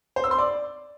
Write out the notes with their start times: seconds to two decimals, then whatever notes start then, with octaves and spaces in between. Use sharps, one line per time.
0.16 C5
0.24 E6
0.31 C6
0.38 D5